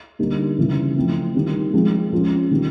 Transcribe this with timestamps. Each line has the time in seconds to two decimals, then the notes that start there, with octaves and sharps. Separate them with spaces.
0.19 D3 G3 A#3 D#4
0.58 C#3 E3 G3
0.96 F3 A3 C4 E4
1.34 D#3 G3 C4
1.73 F3 G#3 C4
2.12 F3 G#3 C#4 F4
2.51 D#3 G3